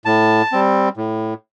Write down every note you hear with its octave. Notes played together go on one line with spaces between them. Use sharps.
A2 A5
G3 C4
A2